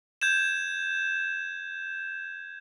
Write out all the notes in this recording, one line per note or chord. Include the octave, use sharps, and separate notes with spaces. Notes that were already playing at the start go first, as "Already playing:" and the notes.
G6 G#6 E7